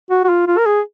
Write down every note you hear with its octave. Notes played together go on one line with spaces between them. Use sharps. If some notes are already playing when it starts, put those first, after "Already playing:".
F#4
F#4
F4
F4
A#4
G#4